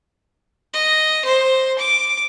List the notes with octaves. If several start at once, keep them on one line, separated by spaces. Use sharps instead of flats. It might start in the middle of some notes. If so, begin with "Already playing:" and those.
D#5
C5
D6